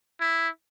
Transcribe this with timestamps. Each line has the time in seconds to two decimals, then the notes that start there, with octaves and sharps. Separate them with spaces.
0.21 E4